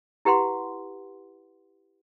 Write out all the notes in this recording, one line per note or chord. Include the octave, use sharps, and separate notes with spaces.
E4 G4 B4 F#5 C6